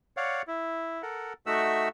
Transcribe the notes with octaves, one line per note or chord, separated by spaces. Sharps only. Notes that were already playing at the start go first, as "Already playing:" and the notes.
C#5 D5 F5 F#5
E4
A4 A#4 F#5
A3 D#4 F#4 E5 F#5 E6